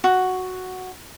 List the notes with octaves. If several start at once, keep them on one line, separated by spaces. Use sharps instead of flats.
F#4